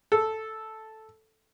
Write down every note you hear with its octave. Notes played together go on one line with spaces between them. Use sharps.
A4